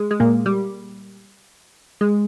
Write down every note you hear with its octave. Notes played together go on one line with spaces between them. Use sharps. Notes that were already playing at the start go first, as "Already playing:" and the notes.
Already playing: G#3
G#3
A#2 A#3
G3
G#3